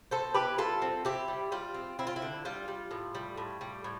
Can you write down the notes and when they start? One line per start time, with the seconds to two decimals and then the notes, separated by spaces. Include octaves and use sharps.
0.11 B2 A4 C5
0.34 E4 G4 B4
0.58 G3 F4 A4
0.82 C4
1.05 C4 E4 G4
1.28 G3
1.52 G3 F4
1.74 C4
1.99 C4 E4
2.07 F4
2.16 E4
2.22 D3
2.45 G3 F4
2.68 G3
2.91 A2
3.15 G3
3.37 A2
3.61 G3
3.84 A2